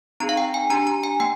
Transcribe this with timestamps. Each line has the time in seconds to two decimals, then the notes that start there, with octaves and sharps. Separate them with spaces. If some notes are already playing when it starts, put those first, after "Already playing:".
0.20 C4 D#4 G#4 A#5
0.29 F5
0.37 G5
0.54 G#5
0.70 D4 G4 A#5
0.87 A#5
1.04 G#5
1.20 A#3 G5